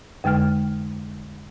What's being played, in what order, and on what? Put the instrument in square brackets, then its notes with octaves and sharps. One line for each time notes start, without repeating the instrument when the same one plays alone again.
[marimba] F2 D3 G#3 G5 F6